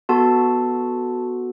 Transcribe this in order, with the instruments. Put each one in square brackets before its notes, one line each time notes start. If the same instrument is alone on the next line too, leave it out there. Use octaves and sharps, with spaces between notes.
[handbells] B3 F#4 A4 A5 C6